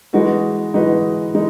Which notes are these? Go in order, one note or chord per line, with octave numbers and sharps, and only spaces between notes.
E3 G#3 D#4 F#4 B4
E3 G#3 D#4 F#4 B4
E3 G#3 D#4